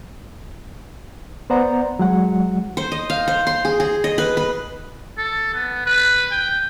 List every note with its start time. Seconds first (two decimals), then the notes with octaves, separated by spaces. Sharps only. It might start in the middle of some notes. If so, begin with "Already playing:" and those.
1.50 B3 C5 D5 F#5 A#5
1.99 F#3 G#3 F#5
2.77 C5
2.92 D#5
3.10 F5
3.28 C5
3.47 C6
3.65 G#4
3.80 G#4
4.04 D#5
4.18 B4
4.37 B4
5.18 A4
5.54 B3
5.86 B4
6.31 G5